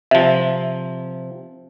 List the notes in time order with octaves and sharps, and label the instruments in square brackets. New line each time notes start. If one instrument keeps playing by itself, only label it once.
[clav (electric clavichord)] C3 F3 [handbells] E5